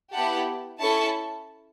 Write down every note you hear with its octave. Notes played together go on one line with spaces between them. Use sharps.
B3 E4 G4 F#5 A5
C#4 E4 A4 A5 C#6